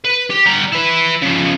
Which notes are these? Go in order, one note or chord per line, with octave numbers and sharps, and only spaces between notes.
B4
G4
G3 A#5
E4 B4
C#3 F3